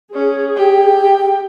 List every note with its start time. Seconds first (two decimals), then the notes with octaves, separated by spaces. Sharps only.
0.14 C#4 G#4
0.56 G4 G5